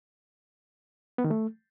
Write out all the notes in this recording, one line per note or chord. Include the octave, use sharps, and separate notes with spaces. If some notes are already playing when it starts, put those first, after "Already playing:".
B3
D#3
A3